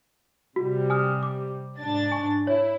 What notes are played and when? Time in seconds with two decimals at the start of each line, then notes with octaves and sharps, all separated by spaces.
0.56 C3 G3 F#4
0.90 G#5 D#6 F6
1.23 D6
1.80 G#2 D4 A6
2.12 G#5 C#6
2.47 E4 C#5